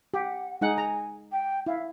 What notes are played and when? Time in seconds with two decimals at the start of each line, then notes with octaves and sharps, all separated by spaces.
0.14 G4 F#5
0.61 G#3 D#4 F#5 G#5
0.78 A#5
1.31 G5
1.66 E4 F5